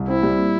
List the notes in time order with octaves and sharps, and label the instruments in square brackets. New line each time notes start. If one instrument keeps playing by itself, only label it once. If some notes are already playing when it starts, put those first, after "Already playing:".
Already playing: [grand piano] C2
[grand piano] C4 [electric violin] E4
[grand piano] G3
A#2